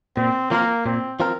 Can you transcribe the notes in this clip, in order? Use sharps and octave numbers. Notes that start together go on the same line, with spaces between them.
A#2 C4
F3 A#3 C4 F4 A#4
A#2 C4
F3 C4 F4 A#4